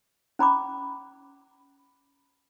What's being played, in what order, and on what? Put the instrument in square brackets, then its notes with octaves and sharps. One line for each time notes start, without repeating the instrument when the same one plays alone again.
[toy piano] C#4 A#5 B5 D6